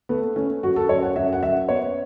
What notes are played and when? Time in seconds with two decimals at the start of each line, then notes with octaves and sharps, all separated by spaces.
0.09 A3 B3
0.36 A3 C#4
0.63 F#2 F#4
0.76 A4
0.89 F#2 C#5
1.03 F#5
1.16 F#2 E5
1.33 F#5
1.43 F#2 E5
1.69 B3 C#5